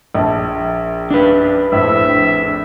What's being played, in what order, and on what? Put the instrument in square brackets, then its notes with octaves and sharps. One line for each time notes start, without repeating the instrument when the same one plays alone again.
[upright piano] A#1 A5
[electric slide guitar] D4 B4
[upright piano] A#1 F2 A2 [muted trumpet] E5